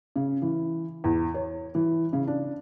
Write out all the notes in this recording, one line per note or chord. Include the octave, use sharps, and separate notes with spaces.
C#3
E3
E2
C#5
E3
C#3
D4